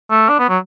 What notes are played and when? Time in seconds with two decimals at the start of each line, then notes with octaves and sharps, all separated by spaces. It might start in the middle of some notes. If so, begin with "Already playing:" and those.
0.11 A3
0.29 D4
0.39 B3
0.49 F#3